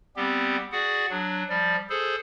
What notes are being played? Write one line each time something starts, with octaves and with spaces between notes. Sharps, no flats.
G3 B3 C4 G4
F#4 G#4 D5 F#5
F#3 D4
F3 G3 D5
G#4 A4 C5